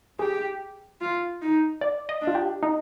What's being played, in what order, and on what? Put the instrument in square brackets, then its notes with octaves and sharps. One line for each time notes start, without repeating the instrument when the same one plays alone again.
[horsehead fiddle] G4 [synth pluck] G#4
[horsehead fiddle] F4
D#4
[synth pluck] D5
D#5
[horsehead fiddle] D4
[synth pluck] F4
G4
D#4